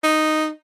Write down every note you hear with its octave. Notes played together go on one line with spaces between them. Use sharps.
D#4